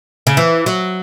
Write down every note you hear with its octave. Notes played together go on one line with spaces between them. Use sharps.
C#3
E3
F#3